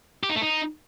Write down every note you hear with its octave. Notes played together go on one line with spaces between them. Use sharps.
G4
D#4
A3
D#4